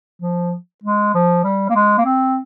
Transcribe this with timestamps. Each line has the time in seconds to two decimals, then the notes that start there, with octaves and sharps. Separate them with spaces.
0.22 F3
0.84 G#3
1.14 F3
1.44 G3
1.70 A#3
1.76 G#3
1.98 A#3
2.05 C4